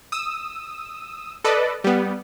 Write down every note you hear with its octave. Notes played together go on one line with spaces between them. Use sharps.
D#6 E6
A4 B4 D5 D#5
G3 B3